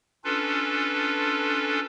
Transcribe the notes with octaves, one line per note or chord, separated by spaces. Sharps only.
C#4 D4 F4 A4 B4